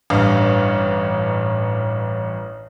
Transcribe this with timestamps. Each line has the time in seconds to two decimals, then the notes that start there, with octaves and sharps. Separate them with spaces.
0.10 A1 G2 F5